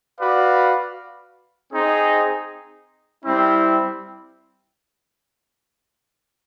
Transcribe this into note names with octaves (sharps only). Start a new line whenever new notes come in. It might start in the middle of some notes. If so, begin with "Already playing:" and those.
F#4 B4 D5 F5
C4 D#4 G#4
G3 C4 E4